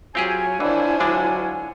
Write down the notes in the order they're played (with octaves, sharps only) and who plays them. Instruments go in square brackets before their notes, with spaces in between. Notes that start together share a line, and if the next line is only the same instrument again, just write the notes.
[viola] F#3 [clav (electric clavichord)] C4 G4 G#4 [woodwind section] F4 C#5 G#5
[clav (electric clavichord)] D#2 E3 [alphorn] D4 [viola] E4 C5
[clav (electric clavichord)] D3 G#3 D4 [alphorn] F#3